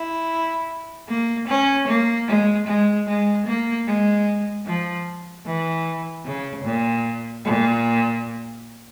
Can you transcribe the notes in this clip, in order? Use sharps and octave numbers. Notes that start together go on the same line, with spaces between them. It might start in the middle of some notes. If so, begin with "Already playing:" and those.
Already playing: E4
A#3
C#4
A#3
G#3
G#3
G#3
A#3
G#3
F3
E3
C#3
A#2
A#2